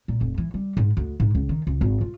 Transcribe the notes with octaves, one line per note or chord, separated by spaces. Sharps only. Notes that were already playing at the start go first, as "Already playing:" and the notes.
A#2
F1
E3
G3
G#2
D2
G#2
C#2
D#3
C#2
G#1
F4